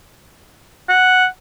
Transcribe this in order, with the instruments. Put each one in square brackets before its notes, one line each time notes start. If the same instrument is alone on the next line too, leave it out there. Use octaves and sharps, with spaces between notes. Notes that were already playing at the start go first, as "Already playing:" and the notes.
[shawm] F#5